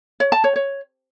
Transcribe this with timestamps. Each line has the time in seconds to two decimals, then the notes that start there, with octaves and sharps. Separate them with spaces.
0.20 C#5
0.32 A5
0.44 C#5
0.56 C#5